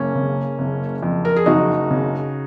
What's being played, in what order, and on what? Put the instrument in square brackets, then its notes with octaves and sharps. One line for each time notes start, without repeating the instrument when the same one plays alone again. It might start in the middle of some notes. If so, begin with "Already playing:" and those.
Already playing: [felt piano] F#1 A#3 C#4
C#3
F#1
F2
A#4
G#4
F#1 D#4 F#4
C#3